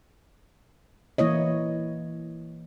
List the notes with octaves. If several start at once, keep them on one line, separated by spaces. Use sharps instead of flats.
E3 A#3 E4 C#5 D#5